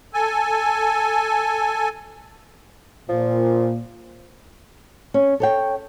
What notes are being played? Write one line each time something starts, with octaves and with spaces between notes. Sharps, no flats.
A4 G#5
A#2 F3
C#4
A4 C#5 G5